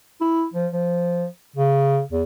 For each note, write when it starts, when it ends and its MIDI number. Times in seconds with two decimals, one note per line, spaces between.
0.21 0.45 64
0.54 0.67 53
0.73 1.25 53
1.56 2.01 49
2.12 2.23 40